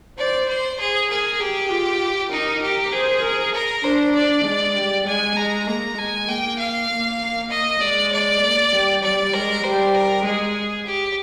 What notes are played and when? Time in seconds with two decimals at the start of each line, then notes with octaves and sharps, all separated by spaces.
0.18 C5 D5
0.49 C5
0.80 G#4
1.10 G#4 A#4
1.40 G4 G#4
1.71 F4
2.31 D#4 A#4
2.63 G4
2.92 G#4 C5
3.23 A#4
3.54 A#4
3.84 D4 C5
4.15 D5
4.45 G#3
4.76 G3
5.07 G#3 G#5
5.37 G#3 A#5
5.67 A#3 A#5
5.98 G#3 G#5
6.28 A#3 G5
6.59 F5
6.90 A#3
7.51 D#5
7.81 G#3 D5
8.12 D5
8.42 A#3
8.73 G3
9.03 G3 D5
9.34 G#3 A#4
9.64 G3 C5
9.95 A#4
10.25 G#3 G#4
10.86 G4